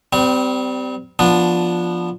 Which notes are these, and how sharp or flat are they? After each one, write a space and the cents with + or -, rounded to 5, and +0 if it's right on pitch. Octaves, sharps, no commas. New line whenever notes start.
G3 -10 C4 -35
F3 +0 B3 -15 D4 +0